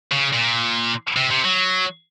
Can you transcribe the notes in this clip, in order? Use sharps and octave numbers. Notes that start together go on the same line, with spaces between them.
C#3
A#2
C3
C3
F#3